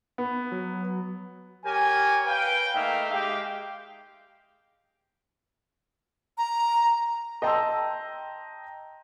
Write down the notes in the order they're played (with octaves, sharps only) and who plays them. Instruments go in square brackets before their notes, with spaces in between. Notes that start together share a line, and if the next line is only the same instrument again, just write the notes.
[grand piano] B3
[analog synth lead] F#3
[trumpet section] G4 A#4 C#5 G#5
B4 F5 G5
A3 A#3 D#4 E5 F5
G#3 G4 F5 G5
[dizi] A#5
[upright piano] D#5 G5 A5 A#5 C6 E6